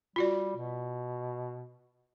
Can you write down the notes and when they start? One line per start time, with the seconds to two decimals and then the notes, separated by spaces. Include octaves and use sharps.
0.16 G3 F4 F#4 D5
0.56 B2